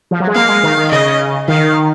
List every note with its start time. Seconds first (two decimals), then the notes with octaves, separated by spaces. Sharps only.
0.11 F3
0.20 F#3
0.27 G#3
0.35 A#3 F5
0.49 G#3
0.63 D#3
0.77 D#3
0.91 C#3 D#5
1.06 C#3
1.48 D#3 F5